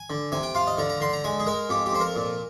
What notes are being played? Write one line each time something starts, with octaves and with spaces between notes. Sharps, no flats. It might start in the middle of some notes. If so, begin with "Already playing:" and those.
Already playing: G#5
D3
C3 G#5
G5
F4 F5
D#5
D3 A#5
A#5
D3 C6
A#5
G#3 G#5
G#4
G#3 A#4
F2 G4
G4
F2 C5
A#4
A#2